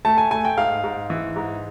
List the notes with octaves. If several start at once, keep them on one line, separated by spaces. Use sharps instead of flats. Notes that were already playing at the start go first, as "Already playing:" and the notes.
A3 A5
G#5
A3 G#5
G5
G#2 F5
G#2
E3
G#2